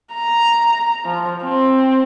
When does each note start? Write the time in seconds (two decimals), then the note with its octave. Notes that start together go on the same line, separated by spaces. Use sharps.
0.15 A#5
1.05 F3
1.44 C4